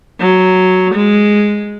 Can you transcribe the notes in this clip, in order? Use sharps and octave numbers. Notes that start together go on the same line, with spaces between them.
F#3
G#3